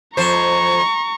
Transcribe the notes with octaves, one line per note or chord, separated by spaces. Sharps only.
F2 C5 A#5 C#6